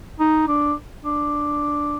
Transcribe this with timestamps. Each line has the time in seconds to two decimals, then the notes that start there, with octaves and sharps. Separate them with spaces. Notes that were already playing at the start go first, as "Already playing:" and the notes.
0.20 D#4
0.48 D4
1.04 D4